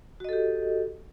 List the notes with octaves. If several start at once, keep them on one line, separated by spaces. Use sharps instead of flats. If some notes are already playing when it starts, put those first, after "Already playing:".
F#4 G4 A4 D#5